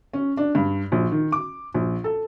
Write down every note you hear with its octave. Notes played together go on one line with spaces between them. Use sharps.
C#4
D4
G2
A#1
D#3
D6
A#1
A4